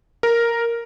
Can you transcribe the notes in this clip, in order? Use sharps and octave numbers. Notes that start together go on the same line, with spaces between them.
A#4